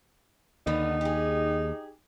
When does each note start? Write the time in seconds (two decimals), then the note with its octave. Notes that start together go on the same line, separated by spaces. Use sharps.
0.67 D#2 D3 B3 D#4
1.01 G4 G#4